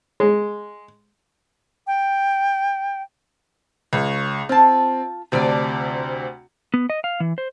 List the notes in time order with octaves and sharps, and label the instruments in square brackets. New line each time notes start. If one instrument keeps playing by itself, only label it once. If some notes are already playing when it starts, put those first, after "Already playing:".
[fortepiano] G#3
[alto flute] G5
[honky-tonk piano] C#2 [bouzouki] C#5
[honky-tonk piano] C4 [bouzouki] F4 A5
[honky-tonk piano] D2 C3 [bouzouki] F3 D4 D5
[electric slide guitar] B3
D#5
F5
E3
C5